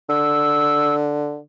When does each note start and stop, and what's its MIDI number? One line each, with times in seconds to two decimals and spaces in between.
0.09 1.39 50
0.09 0.95 88